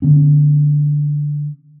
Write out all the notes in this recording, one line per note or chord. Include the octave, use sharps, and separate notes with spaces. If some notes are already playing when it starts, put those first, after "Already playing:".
D3 B3 C#4